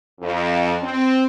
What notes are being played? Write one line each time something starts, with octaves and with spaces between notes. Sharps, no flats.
F2
C4